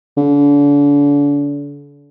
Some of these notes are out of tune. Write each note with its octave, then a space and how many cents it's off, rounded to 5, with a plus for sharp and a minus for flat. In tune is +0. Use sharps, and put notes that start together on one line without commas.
D3 -40